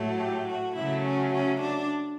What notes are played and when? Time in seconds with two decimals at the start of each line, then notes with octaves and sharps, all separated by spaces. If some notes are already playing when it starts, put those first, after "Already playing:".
Already playing: A2 F#3 A3
0.20 G4
0.47 F#4
0.76 C#3 F#3 A3 E4
1.04 C#4
1.33 C#4
1.62 D4